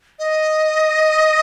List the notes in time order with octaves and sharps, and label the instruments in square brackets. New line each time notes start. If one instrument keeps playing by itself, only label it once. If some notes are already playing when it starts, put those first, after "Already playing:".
[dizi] D#5